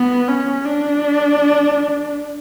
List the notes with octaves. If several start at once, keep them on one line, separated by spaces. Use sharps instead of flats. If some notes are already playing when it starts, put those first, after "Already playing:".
Already playing: B3
C#4
D4